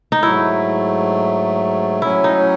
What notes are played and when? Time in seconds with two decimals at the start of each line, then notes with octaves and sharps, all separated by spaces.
0.12 D#4
0.23 G#2 F#3 A3 E4
2.02 A2 F#3 C#4 E4
2.24 D#4